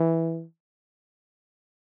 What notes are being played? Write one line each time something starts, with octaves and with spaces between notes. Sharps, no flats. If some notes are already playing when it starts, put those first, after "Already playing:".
Already playing: E3